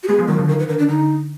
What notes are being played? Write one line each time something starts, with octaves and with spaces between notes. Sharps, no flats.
F#4
G#3 B3 G#4
F3 G#3
D#3 F#3 A#4
D3 F3
D#3 A#4
B4
D3 A#4
D4
D3 D#4